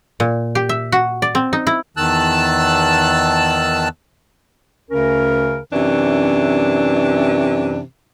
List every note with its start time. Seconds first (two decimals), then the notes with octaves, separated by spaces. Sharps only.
0.20 A#2
0.55 G4
0.69 E5
0.92 F#4
1.22 D5
1.35 C4
1.53 D#4
1.67 E4
1.97 E2 D#3 A5 E6 F#6
4.91 D2 C#3 C#4 A#4
5.72 F#2 C3 E3 C#4 D4